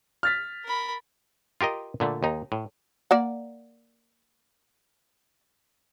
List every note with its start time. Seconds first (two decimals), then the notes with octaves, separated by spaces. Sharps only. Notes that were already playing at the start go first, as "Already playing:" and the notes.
0.23 F6 A6 B6
0.65 A#4 B5
1.61 F4 G4 A#4 D#5
2.00 A#2 D3 A3
2.23 D#2 D#4
2.52 A2
3.11 A#3 D5 F#5